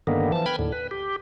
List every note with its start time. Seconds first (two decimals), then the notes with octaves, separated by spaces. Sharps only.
0.07 G2 D3 D#3 A#3 B3
0.32 E3 F3 A5
0.46 B4 G5 B5 F6 G#6
0.59 D#2 A2 D3
0.72 B4
0.91 G4